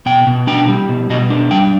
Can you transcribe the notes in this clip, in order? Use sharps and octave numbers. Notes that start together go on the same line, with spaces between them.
B2 G5
B2
D4 G5
G3
B2
B2 D#5
D4
G3 G5